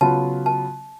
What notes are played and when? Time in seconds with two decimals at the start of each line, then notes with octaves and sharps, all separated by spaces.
0.01 C#3 F#3 B3 F4 A5
0.46 A5